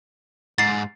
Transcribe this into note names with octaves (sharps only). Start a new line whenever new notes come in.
G#2 A6 C7